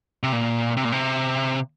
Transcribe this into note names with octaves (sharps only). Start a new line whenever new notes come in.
C3
A#2
C3
A#2
C3